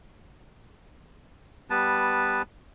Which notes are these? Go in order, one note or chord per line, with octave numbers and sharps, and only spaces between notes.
G3 B3 B4 A5